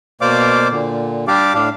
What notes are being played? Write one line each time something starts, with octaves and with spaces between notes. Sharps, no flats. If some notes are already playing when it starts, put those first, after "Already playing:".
B2 A#3 C5 D5 F5 D6
A#2 D3
G3 D4 G4 D5 F5 D6
A2 D4 F5